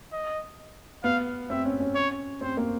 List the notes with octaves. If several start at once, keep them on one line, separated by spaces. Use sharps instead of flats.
D#5
B3 F5
C4 E5
C#4
C#4
C#5
C4 C5
A#3